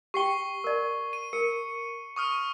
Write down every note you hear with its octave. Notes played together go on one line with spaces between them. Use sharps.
G4 G5 C#6 C7 G7
A#4 D5
D#7
A#4 C#7
C#6 D#6 F6